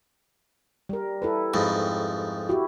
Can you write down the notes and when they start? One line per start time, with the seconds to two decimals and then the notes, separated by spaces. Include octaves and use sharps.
0.89 G3 A#4
1.22 E4 A4 B4
1.54 F2 G#2
2.49 E4 F#4 G4